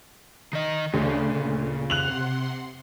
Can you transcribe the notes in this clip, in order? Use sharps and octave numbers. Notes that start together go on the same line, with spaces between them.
D#3 D#5
D2 C#3 D4
A#2
C3 F#5 C6 F#6 F7 F#7